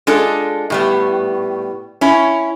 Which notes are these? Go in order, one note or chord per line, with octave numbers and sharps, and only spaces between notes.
G#3 D4 F4 A4
A2 G3 B3
C#4 E4